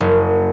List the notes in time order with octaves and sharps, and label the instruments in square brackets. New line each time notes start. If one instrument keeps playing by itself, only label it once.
[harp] F#1